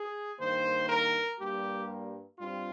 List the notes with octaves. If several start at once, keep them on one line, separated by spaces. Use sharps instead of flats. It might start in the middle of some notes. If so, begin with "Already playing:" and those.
Already playing: G#4
G2 D#3 A#3 C5
A#4
G2 G3 A#3 G4
G2 G3 C4 F4